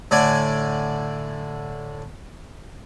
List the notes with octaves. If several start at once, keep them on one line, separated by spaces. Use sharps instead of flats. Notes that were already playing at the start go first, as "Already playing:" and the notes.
A2 D3 D5 G#5